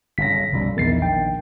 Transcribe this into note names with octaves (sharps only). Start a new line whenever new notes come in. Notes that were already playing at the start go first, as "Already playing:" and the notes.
G1 C#3 A#6 B6
B1 F#2 G3
A#1 E2 D#3 A6 C7
G5